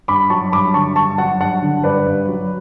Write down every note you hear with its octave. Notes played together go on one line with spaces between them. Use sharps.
G2 B5 D6
F#3 A5 C#6
G2 B5 D6
D3 A5 C#6
G2 A5 C#6
F#3 F#5 A5
G2 F#5 A5
D3
G2 B4 D5
G2
F#3